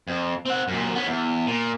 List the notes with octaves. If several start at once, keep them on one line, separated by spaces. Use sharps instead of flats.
F2
C4 F#5
F#2 A#2
B3 C#4
E2
A#2